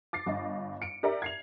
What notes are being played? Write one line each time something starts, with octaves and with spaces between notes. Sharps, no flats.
D6 A6 C7
G1 D#5
C#7 D7
G4 A#4 D5 E5 A#5
G#6 C7 F7